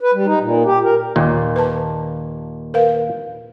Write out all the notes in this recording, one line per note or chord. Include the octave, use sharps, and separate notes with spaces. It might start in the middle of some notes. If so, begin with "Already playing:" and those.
B4
G3
D#4
A#2
G4
A#4
D#2 A#2
B4 A5
A#4 B4 F5